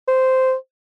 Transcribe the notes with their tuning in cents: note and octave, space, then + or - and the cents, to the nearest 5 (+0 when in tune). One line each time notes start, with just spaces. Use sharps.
C5 -10